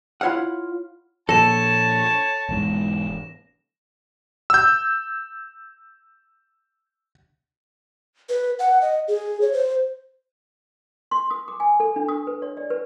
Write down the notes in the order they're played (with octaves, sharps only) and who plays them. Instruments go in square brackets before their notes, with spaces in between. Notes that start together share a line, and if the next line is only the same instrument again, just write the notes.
[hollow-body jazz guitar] E4 F4 C#5 F5 F#5
[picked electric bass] A#2 F3 [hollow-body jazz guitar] A4 [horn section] C#5 A5 [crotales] A#6 E7
[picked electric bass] E1 E2 G#2
[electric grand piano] E6 G6
[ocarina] B4
F#5
D#5
G#4
C#5
C5
[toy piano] C6
D#6
D6
G#5
A4
D4
D#6
B4
C#5
D5
B4